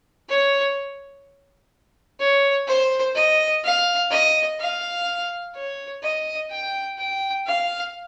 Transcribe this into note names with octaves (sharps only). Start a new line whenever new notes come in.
C#5
C#5
C5
D#5
F5
D#5
F5
C#5
D#5
G5
G5
F5